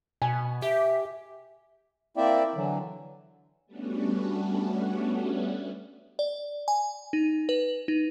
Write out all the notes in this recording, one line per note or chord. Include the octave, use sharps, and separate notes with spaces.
B2 G#5
G4 E5
A#3 C4 E4 D5 E5 G5
D3 E3 F#3
G3 A3 B3 C#4 D4 F#4
D5
G#5
D#4
B4
D#4